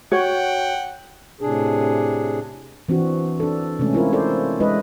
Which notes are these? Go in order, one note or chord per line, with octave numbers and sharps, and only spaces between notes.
F#4 C#5 F#5 G5
A2 C3 D4 G#4
E3 C4 D4 F#4
D4 A4
C3 G#3 A3 C#4
C4 E4 F4 A#4
E4 A4 C5 D5
G#3 D4 E4 B4 D#5